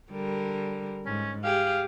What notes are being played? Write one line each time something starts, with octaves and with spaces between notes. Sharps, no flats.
D3 G3 A#4
G#2 C#4
G4 G#4 F5